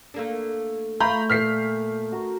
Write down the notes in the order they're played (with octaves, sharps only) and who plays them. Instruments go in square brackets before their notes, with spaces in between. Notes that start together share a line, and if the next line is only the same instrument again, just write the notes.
[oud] A3 A#3 D4
[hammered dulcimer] A3 [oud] F4 [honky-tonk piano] A#5 B5 G6
[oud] A#2 A4 [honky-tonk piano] F6 B6 C7
[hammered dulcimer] F#4 A#4